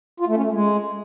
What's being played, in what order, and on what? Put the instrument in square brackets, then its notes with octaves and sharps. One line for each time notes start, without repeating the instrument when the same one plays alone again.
[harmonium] F4
A3
C#4
A3
G#3